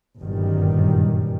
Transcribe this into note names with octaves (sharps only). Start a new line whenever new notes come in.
G1 F#2 A#2 D#3 G3